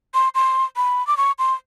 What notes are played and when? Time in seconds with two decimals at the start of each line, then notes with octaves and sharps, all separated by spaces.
0.14 C6
0.35 C6
0.76 B5
1.07 D6
1.17 C#6
1.39 C6